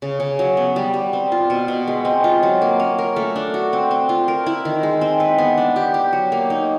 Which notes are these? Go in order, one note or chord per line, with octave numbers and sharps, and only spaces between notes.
C#3
C#3
F#3
B3
G3
G3
C4
F4
B2
B2
G#3
C4
F4
F#3
A#3
C#4
A#4
A3
D4
F#4
C4
C4
F4
A#4
E4
D#3
G#3
C4
B4
B3
D4
G4
G4
F#3
A#3
D#4